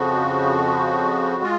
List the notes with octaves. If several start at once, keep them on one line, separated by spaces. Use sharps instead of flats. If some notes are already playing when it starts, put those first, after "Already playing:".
Already playing: F2 C#3 F3 F#4
G#3 F4